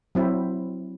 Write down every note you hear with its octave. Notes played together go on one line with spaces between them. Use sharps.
F#3 C4 E4